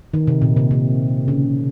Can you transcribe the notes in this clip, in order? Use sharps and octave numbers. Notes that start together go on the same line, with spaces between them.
D#3
C3
A#2
C3
C3
C#3